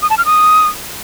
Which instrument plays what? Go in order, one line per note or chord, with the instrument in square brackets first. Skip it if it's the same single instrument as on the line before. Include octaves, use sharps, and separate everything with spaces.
[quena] D#6
A5
F6
D#6